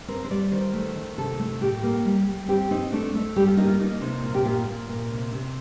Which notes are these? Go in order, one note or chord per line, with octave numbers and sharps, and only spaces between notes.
C4 A#4
C5
G3 D5
D#3 C5
A3
D#3
C3 A4
A3 A4
A2 G4
A#3
G3
G3
C4 G4
C4 D#4
A3 D4
A3
G3 G4
F4
A#3 D#4
F4
A#3 D#4
C3 D#4
A#2 F4
G4
A#2 F4
A#2
A#2
C3
C3